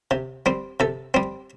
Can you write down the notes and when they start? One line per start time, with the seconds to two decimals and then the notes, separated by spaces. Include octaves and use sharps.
0.11 C3
0.46 G3 C4
0.80 C3 A4
1.14 G3 C4